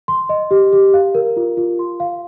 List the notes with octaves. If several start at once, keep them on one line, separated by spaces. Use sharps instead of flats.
C6
D#5
G4
G4
F5
A#4
F4
F4
C6
F5